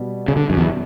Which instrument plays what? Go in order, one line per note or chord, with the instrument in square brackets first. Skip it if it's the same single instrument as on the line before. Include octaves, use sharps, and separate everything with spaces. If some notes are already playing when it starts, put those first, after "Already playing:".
Already playing: [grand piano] B2 G3 B3
[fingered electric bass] C#3
D3
F#2
E2